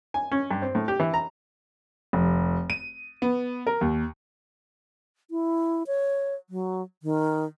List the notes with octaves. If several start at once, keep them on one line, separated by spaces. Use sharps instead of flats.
G#5
C#4
G2
C4
A2
G4
E3
A#5
F1
D#7
B3
A#4
D#2
E4
C#5
F#3
D#3